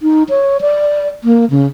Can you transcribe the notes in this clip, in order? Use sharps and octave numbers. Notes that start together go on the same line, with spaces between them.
D#4
C#5
D5
A#3
C#3